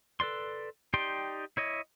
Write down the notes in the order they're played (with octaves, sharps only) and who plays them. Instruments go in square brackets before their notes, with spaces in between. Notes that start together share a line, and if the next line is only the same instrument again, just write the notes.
[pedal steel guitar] A4 B4 D5 C6
D#4 G4 D5 G5 C6
E4 C#5 D#5